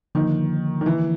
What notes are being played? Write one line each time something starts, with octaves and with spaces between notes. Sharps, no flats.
D3 D#3 F3 A#3
D#3
E3